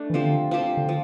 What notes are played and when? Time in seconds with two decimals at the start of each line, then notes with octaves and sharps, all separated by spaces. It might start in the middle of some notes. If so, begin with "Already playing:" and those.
Already playing: A3 D4
0.10 E3
0.14 D3 F3 C4 G4 C5
0.51 F3 C4 G4 C5
0.77 D3
0.89 F3